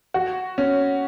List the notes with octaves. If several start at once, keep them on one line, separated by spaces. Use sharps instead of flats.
F#4
C#4